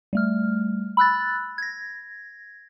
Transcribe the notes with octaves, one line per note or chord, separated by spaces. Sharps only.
G3 A3 F6
B5 E6 F#6 A6
G#6 A#6